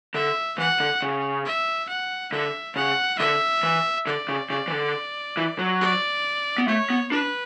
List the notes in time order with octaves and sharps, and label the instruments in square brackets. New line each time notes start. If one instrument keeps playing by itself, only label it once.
[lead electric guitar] D3 [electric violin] E5
[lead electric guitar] E3 [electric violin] F#5
[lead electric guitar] D3
C#3
[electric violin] E5
F#5
[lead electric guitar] D3 [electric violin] E5
[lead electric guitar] C#3 [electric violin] F#5
[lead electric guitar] D3 [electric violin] E5
[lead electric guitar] E3
[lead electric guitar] D3 [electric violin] D5
[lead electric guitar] C#3
[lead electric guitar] C#3 [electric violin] D5
[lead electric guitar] E3
D3
E3
F#3
[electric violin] D5
[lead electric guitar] B3
[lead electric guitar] A3 [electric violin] C#5
[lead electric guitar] B3
[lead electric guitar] D4 [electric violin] B4